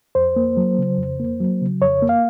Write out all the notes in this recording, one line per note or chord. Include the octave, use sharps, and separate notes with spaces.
F2 C5
A#3
F#3
C#3
F2
A#3
F#3
C#3
F2 C#5
A#3
F5